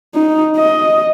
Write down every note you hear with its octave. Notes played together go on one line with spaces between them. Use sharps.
D#4
D#5